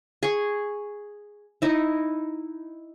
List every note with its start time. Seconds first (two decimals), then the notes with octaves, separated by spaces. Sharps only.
0.23 G#4 C#6
1.62 D#4 E4